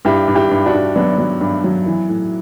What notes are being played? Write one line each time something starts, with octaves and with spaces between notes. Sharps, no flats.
G2 E4 G4
G2
E4 G4
G2
D4 F#4
G2
F#3 B3 D4
F#3
G2
F#3
E3
A2